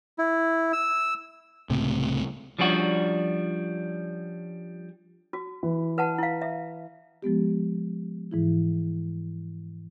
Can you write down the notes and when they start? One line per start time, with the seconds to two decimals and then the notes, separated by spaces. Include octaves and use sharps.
0.18 E4
0.73 E6
1.70 C#2 A2 C3
2.59 F3 G3 C#4 D4 F#4
5.33 F#4
5.63 E3
5.98 B4 F#5 A5
6.18 E4 F5
6.42 E5
7.22 F3 G#3 B3 G4
8.31 G#2 E3 E4